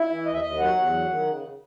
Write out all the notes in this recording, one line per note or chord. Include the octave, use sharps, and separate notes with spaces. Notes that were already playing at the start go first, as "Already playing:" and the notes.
Already playing: E4
E3
D#2 D#5
E5
D#2 D#5
F#3 F#5
E2
F#3
D#3
C#3